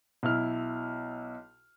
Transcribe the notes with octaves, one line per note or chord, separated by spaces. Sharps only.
B1 E4 F6